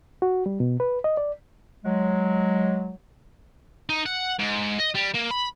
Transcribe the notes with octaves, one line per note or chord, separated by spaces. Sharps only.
F#4
G3
B2
B4
D#5
D5
F#3 G#3
D#4
F#5
G#2
D#5
G3
A#3
B5